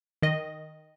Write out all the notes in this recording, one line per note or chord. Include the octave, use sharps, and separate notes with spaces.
D#3 D#5